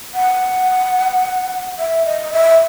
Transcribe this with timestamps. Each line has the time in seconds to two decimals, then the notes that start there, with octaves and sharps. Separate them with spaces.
0.14 F#5
1.79 E5
2.06 D#5
2.32 E5